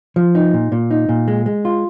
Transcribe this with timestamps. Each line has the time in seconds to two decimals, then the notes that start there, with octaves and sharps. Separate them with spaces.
0.16 F3
0.35 D#4
0.53 A#2
0.72 A#2
0.91 D#4
1.09 A#2
1.28 G#3
1.46 G#3
1.65 F4